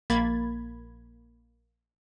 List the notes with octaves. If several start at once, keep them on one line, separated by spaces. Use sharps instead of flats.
A#1 A#3 B5 G#6 A6